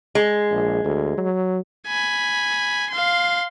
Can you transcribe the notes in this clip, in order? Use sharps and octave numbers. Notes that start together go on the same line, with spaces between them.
G#3
A#1
D2
F#3
G#5 B5
F5 C6